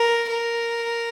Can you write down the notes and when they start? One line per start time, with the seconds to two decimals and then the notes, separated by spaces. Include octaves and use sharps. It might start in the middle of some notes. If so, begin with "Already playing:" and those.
Already playing: A#4
0.30 A#4